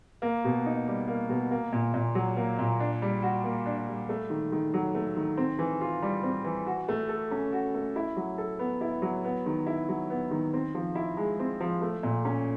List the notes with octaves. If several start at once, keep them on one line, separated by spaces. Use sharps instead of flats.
A#3
B2
D#4
G3
A#3
B2
A#3
A#2
A#2
F#3
A#3
A#2
D4
G3
F#4
A#3
D4
G3
A3
D#3
D#3
F#3
A3
D#3
C4
E3
F4
G3
C4
E3
F#4
A3
A4
C#4
F#4
A3
E4
F#3
A4
B3
E4
F#3
B3
D#3
E4
F#3
B3
D#3
C4
F3
E4
G#3
C4
F3
A3
A#2
C#4